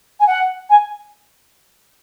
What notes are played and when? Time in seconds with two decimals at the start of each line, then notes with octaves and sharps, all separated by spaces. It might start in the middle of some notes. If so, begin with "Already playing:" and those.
0.20 G#5
0.27 F#5
0.70 G#5